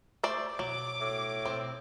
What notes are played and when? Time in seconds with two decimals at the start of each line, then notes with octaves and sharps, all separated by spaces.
0.24 A3 C5 D5
0.59 B2 F#3 D6
1.01 A2
1.46 B2 C4